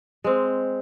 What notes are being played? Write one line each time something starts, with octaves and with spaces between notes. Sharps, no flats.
G#3 C4